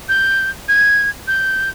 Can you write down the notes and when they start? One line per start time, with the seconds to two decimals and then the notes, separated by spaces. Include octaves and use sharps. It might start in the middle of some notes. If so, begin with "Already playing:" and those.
0.09 G6
0.68 G#6
1.28 G6